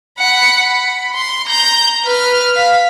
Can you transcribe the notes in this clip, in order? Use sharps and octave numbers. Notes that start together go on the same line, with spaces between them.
F#5 B5
B5
C6
A#5 G6
B4 F6
F5 B6